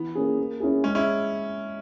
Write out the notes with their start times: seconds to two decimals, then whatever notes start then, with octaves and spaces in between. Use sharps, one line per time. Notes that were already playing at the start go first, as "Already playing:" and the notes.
Already playing: E3 B3
0.15 A#3 C#4 G#4
0.38 A#3
0.60 C#4 E4 G#4
0.84 G#3 C#4
0.95 C#4 E4